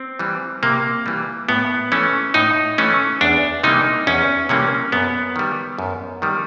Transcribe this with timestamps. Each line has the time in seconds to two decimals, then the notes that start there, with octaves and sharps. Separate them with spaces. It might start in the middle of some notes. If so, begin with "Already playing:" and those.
Already playing: C4
0.19 E3 G3
0.63 C3 A#3
1.06 E3 G3
1.49 A2 B3
1.92 E3 A3 C#4
2.34 A2 D#4
2.78 E3 A3 C#4
3.21 E2 D4
3.63 C3 E3 G3 A#3 D#4
4.07 E2 C#4
4.49 C3 E3 G3 A#3 C#4
4.92 F#2 B3
5.36 D#3 G3
5.79 F#2
6.22 D#3 G3